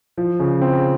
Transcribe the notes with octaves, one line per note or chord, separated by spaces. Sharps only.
F3
C#3
C4